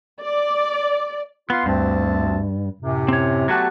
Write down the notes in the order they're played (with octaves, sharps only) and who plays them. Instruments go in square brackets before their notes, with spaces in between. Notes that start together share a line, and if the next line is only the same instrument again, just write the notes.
[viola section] D5
[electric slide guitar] B3 [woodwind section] F4 C6
[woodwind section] D2 C4 A5 [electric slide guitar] G2
[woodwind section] F#2 A2 C3
[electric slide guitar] C4 C#5
[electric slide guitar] F#3 A3 F#4 [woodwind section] B3 G4 A5